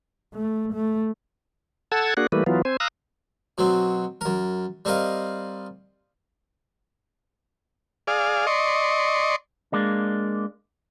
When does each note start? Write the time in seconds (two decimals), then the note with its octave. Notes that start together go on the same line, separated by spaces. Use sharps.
0.34 A3
0.73 A3
1.92 A4 F#5 A5 E6 G#6
2.17 A#3 D4 F#4 G#4 F#5
2.32 E3 G3 A3 A#3 B4
2.46 E3 F#3 B3 F4
2.65 C4 C5 G#5
2.80 F5 A#5 D#6 E6 F#6
3.58 B2 F#3 C4
4.21 F#2 A#4
4.85 G3 C4 A#4 D#5 F5
8.07 G#4 D5 F5
8.47 D5 D#5 C6 C#6
9.72 G#3 A#3 D4